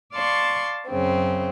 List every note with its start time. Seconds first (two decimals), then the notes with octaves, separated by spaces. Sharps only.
0.13 D5 F5 A5 C6 C#6
0.88 F#2 C#3 C4